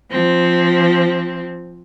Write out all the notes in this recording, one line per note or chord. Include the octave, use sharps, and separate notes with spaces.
F3 C4